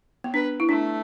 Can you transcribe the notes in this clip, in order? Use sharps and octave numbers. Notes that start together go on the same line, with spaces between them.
B3
D4 B4
E4
A3 D4